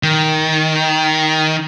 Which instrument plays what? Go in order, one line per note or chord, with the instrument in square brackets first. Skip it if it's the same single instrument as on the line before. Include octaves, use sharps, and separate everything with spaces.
[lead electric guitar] D#3